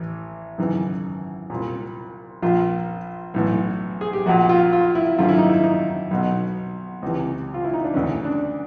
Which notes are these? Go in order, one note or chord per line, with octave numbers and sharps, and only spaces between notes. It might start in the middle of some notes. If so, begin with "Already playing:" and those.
Already playing: A1 E3
G#1 F#2 C#3 E3
C2 A#2
A#1 A#2 F4
B1 A2 E3
G#4
G4
A#1 A#2 F#4
F4
F4
E4
G#1 F#2 D3 F4
E4
D#4
E4
D#4
B1 B2
C#2 C3 E3
F4
E4
D#4
D4
D2 C#3 E3 C#4
D4